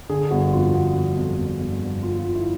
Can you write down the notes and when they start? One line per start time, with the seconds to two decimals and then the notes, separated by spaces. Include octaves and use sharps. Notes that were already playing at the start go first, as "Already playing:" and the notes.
0.10 D3 G#4
0.31 G1 F#4
0.53 F2 F4
0.74 G1 F#4
0.95 G1
1.17 F2
1.39 F2
1.60 G1
1.81 G1
2.03 G1 F4
2.19 F4
2.24 G1
2.35 E4